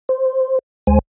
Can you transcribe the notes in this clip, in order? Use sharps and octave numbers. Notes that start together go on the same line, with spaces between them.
C5
D2 G#3 C5 G#5